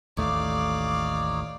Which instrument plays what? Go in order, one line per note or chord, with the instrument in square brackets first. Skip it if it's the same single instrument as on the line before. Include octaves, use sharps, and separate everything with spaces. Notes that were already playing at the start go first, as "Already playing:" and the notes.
[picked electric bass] A1 D#2 A3 [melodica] D#4 C#5 [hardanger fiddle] D5 F5 [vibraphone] D6